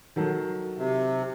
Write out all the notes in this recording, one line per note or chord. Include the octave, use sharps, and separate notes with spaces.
D#3 F#3 A4
C3